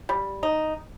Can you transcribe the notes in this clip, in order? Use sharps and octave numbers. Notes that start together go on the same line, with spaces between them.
G3
D#4